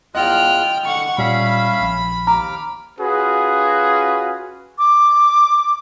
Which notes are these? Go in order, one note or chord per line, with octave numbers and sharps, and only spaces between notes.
E2 F4 D#5 G5 F6 F#6
D3 F#5 C#6
A#2 G3 C#4 E5 F5 B5
A#1
D#2 A#5 D6 F6
C#4 F4 F#4 G#4 B4
D6